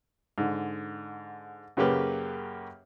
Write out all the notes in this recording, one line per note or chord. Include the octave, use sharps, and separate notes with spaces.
G#2 D3
F#2 C#3 A#3 G4 B4